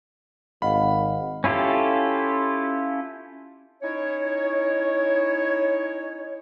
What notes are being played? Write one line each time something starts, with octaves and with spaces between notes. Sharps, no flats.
G#1 D#5 F5 F#5 B5
C#4 E4 F4 G4 A4
C#4 D#4 E4 C#5